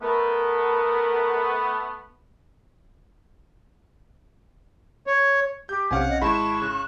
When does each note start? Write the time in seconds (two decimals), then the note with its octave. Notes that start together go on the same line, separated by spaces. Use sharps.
0.02 A3 B3 A#4
5.07 C#5
5.69 G4 G6
5.91 B1 C3 C#4 F5 F#5 G#5
6.10 D#5
6.22 G#1 G#3 E4 A5 B5 C#6 E7
6.62 C#3 F#6